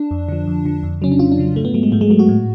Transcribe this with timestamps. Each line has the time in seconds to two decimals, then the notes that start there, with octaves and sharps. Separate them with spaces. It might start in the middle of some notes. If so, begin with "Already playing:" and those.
Already playing: D4
0.11 F2
0.28 D3 F3
0.47 F2
0.65 D3 F3
0.83 F2
1.02 C#3 F#3 C#4
1.12 D4
1.19 F2 F4
1.32 D4
1.38 C#3 F#3
1.56 G#2 A3
1.65 B3
1.74 F#3 A3
1.83 G#3
1.92 G#2 A3
2.01 G#3
2.10 F#3 A3
2.19 F#4
2.29 A2